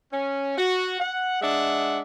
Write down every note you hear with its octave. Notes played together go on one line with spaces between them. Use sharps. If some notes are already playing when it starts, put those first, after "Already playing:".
C#4
F#4
F#5
G#3 D4 E5 F#5